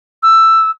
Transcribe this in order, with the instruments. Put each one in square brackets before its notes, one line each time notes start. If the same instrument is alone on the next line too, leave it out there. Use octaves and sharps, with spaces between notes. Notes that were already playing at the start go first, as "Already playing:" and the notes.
[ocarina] E6